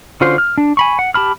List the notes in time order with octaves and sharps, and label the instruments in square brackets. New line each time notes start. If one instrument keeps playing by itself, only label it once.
[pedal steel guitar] D3 C#4 F4 F#4 C5
F6
D4
G#5 B5 C#6
F#5
G4 A5 B5 F6